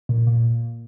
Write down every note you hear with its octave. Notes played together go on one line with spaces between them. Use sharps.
A#2
A#2